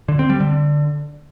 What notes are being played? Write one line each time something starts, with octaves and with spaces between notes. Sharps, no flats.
D3
C4
G3
D3